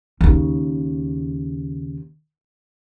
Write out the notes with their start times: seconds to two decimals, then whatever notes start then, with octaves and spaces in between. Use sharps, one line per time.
0.21 D#2 C#3